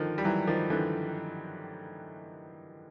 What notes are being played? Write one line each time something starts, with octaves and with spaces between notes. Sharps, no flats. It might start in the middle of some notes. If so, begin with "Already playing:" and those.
Already playing: D3 D#3 F3
G3
E3 F#3
D#3 F3
D3 E3